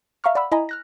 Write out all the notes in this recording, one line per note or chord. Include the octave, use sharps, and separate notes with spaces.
E5 F5 A#5 C#6 F6
D5 F#5 B5 E6
E4 D#5 G#5 A#5 B5
F6 F#6 A#6